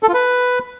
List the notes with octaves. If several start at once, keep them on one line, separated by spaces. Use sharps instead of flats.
A4
F4
B4